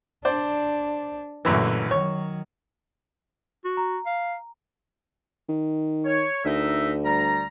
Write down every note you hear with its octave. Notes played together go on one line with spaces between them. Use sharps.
D4 C5 D5
A1 F#2 A#2 D3 E3
D#3 F#3 C#5
F#4
A#5
F5
D#3
C#5
D2 D#4 A#4 E5
G3 A#5